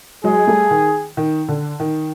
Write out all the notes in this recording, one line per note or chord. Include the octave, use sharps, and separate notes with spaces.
F#3 G#3 G#4
G3 A3
D#3
D#3
D3
D#3